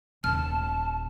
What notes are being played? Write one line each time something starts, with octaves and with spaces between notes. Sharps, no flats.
D#1 A5 F6